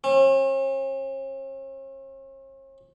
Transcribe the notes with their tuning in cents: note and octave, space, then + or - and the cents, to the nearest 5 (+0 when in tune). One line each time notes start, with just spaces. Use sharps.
C#4 -45